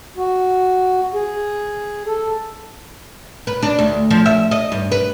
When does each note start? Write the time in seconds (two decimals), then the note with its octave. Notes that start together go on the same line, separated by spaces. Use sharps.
0.17 F#4
1.14 G#4
2.06 A4
3.47 B4
3.63 D4
3.79 D2
4.11 F3
4.26 E5
4.51 D#5
4.72 G2
4.92 B4